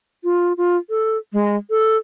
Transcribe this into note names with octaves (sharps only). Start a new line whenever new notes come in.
F4
F4
A4
G#3
A4